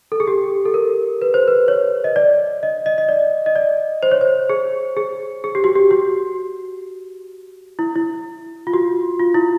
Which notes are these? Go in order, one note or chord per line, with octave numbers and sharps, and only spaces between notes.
A4
G#4
G4
A4
A#4
B4
C5
B4
C#5
D#5
D5
D#5
D#5
D#5
D5
D#5
D5
C5
C#5
C5
G#4
G#4
G#4
G4
F#4
G4
F#4
E4
E4
F4
F#4
F4
E4